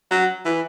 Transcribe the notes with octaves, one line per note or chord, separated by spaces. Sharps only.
F#3
E3